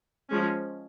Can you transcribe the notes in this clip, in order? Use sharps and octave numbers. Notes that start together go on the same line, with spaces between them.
F3 G#3 C#4